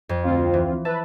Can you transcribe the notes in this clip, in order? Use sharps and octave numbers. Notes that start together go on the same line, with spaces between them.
F2
D2 C4 F4
E3
B4 E5 A5